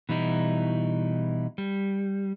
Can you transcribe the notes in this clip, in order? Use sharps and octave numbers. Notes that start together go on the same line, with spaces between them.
B2 E3 G3 D#4 E4
G3